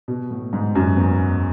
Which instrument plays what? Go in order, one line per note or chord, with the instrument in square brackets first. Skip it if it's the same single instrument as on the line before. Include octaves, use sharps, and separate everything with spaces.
[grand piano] B2
A2
G#2
F#2
E2